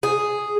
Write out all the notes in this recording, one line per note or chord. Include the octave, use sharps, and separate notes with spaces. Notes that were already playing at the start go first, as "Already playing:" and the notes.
G#4